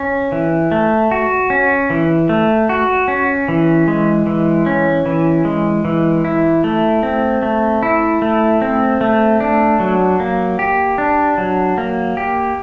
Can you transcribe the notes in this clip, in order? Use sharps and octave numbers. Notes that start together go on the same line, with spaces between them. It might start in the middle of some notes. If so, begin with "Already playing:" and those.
Already playing: C#4
E3
A3
F#4
C#4
E3
A3
F#4
C#4
E3
G#3
E3
C#4
E3
G#3
E3
E4
A3
C4
A3
E4
A3
C4
A3
D4
F#3
A#3
G4
D4
F#3
A#3
G4